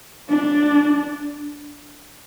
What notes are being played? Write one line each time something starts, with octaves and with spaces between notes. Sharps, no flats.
D4